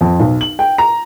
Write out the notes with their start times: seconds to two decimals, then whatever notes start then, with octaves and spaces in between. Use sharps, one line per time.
0.01 F2
0.20 B1
0.41 F#7
0.59 G5
0.78 A#5